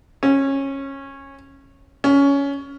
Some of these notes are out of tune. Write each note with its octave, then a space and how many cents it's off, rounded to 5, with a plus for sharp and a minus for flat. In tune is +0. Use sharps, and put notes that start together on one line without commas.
C#4 -20
C#4 +15